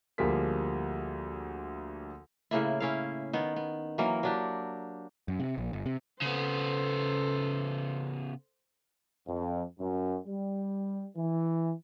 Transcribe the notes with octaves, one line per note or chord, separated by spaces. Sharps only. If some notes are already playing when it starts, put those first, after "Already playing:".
D2 F3 G3 A#3 G#4 B6
A2 C#3 A#3 E4
C#4 E4 F5
D#3 B3
B3
E3 F#3 A#3 A#4
F#3 D4 G4
F#2
C3
A#1
G1
C3
C#3 B3 A4 C5
F2
F#2
G3
E3